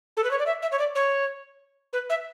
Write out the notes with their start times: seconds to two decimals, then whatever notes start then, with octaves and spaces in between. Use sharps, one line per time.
0.17 A4
0.24 B4
0.31 C#5
0.39 D5
0.46 E5
0.62 E5
0.72 C#5
0.79 D5
0.95 C#5
1.93 B4
2.10 E5